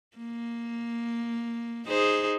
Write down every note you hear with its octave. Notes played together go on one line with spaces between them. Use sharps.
A#3
D#4 G#4 C5